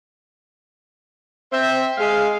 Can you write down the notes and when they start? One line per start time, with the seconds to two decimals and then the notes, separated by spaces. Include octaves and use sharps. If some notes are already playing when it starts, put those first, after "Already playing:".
1.52 C4 C5 E5
1.98 G#3 F5